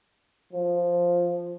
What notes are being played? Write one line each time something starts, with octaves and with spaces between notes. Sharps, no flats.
F3